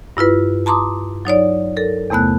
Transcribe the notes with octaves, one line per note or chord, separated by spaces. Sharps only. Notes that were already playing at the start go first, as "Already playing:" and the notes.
G2 E4 F4 B4
A5 A#5 C6 D6 D#6
F#3 D#4 C#5 D5
A4 A#4
E2 C3 A3 B3 F#6